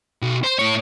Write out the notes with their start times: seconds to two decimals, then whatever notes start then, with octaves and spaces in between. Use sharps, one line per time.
0.22 B1
0.44 C5
0.59 A2 C#5